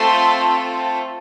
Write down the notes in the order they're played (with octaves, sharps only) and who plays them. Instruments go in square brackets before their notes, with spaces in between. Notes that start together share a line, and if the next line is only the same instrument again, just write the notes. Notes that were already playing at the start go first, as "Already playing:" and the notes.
Already playing: [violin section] A3 C4 F4 A4 C6